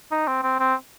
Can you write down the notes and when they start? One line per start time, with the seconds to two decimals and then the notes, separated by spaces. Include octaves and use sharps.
0.11 D#4
0.28 C4
0.43 C4
0.60 C4